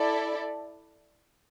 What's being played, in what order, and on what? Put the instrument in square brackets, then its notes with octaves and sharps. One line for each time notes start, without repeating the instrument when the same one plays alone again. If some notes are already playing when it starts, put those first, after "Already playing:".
Already playing: [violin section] E4 A4 D5